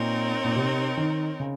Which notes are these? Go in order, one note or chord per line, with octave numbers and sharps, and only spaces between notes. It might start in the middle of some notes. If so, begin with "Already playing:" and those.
Already playing: A#2 C4 D#4 A#4 C#5
A#2
C3
D#3
C#3